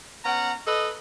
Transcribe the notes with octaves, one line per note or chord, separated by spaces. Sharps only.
B3 C#4 F#5 A#5
A4 B4 D#5